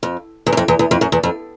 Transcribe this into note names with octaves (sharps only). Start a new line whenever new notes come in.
F2
E2
F#2
F2
E2
E2
F2
F#2
E2
F2